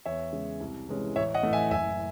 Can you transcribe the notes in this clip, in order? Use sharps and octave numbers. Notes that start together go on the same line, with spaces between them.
E2 C#5 E5
C#3 G#3
C2
C3 E3 G#3 C#4
A1 C#5 E5
D#5 F#5
A2 E3 A3
E5 G#5
F#1 E5 G#5